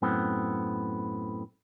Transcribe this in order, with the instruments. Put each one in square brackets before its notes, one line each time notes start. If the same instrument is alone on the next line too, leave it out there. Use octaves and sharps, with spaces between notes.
[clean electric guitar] F#2 A2 B3 C4